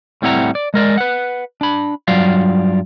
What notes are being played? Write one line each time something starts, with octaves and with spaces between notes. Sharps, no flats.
A2 G3 C4 E4 F#5 A#5
D5
G#3 A#4 D5
B4 F#5
D4 B5
G2 F#3 F4 D5 F5